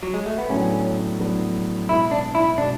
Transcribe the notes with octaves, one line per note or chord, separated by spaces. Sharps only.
F#3
G#3
A3
B3
A2 F#3 B3 C#4 D4 A4
A2 F#3 B3 D4 A4
B2 G#3 B3 E4
D4
E4
B2 G#3 D4